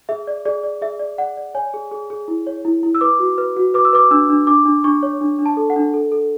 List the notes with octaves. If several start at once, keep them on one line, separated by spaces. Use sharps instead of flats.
G#4 E5
D5
G#4 D5
D5
G#4 E5
D5
D5 F#5
D5
C#5 G#5
G#4
G#4
G#4
E4
C#5
E4
E4
E6
B4 D6
F#4
B4
F#4
B4 D6
E6
B4 D6
D4 E6
D4
D4 D6
D4
D4 C#6
C#5
D4
D4
A5
A4
F#5
D4
A4
A4